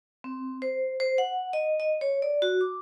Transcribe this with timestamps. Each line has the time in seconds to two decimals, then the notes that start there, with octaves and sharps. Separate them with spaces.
0.24 C4
0.62 C5
1.00 C5
1.18 F#5
1.53 D#5
1.80 D#5
2.01 C#5
2.22 D5
2.42 F#4
2.61 D6